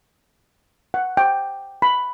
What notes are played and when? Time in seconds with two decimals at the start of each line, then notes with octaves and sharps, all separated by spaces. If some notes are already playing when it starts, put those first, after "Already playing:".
0.94 F#5
1.17 G5
1.82 B5